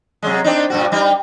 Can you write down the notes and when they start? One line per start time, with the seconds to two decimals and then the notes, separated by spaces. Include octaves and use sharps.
0.23 C3 F#3 G#3
0.44 C4 D4 D#4
0.70 G2 A#2 F#4
0.92 G3 D#4